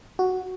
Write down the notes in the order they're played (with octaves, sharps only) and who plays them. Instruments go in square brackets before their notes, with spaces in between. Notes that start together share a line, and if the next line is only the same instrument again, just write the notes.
[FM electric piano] F#4